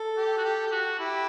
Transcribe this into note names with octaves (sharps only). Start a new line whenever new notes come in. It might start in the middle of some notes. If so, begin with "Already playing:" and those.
Already playing: A4
G4
F#4
G4
G4
F#4
E4 G4